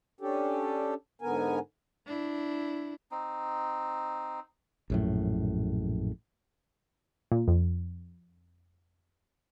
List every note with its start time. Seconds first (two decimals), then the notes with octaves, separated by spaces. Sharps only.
0.21 C#4 D4 G4 A4
1.22 G#2 D3 B3 A#4 G#5
2.06 D4 E4
3.11 C4 D#4
4.90 A#1 F#2 A2
7.32 A#2
7.48 F2